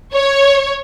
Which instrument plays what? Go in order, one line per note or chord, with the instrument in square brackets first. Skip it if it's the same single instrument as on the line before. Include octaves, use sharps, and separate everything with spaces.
[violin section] C#5